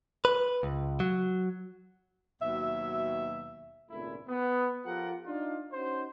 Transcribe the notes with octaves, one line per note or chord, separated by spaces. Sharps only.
B4
C#2
F#3
D#2 B2 F#3 E5
G#1 C#2 A#2 A3 E4
B3
F3 F4 G4 A4 A#4 F#5
D4 D#4 F4
C#4 D#4 F#4 C5